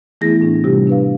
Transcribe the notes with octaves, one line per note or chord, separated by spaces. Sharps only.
E3 A3 B3 E4 G#4 A#6
A2 D4
C3 G3 F4 G4
D4 B4 F5